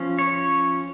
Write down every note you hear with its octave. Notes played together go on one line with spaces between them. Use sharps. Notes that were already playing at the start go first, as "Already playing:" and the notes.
Already playing: F3 C#4
C#5